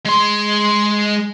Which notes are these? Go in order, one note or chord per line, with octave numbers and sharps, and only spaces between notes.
G#3 C6